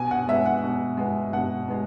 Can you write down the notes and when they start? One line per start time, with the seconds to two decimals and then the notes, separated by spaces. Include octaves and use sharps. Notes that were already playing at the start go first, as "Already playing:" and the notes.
Already playing: B2 G#5
0.11 F#5
0.28 G#3 B3 E5
0.46 F#5
0.64 B2
0.97 G#3 B3
1.33 B2 F#5
1.68 G#3 B3